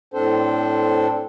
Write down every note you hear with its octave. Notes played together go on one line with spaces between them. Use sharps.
A2 C4 D4 A4 C5